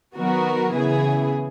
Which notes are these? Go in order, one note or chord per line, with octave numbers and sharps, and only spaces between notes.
D#3 F#3 B3 F#4 A#4
C#3 E3 B3 E4 G#4